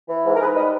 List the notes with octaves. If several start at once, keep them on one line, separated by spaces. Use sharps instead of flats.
E3
G#2
A#4
G#2 G#4 B4
G3 B4 D#5